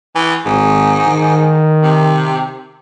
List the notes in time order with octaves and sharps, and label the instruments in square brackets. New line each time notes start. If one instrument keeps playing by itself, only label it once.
[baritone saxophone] E3
[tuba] G#1 [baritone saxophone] G#2
[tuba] D#3
[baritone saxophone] C3